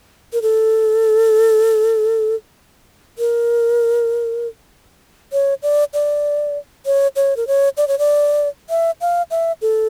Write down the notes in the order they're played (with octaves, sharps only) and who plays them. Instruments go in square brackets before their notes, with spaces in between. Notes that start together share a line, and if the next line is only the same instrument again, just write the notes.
[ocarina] A#4
A4
A#4
C#5
D5
D5
C#5
C#5
A#4
C#5
D5
C#5
D5
E5
F5
E5
A4